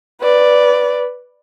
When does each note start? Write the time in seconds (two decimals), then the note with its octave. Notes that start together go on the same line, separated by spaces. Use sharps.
0.22 B4 D5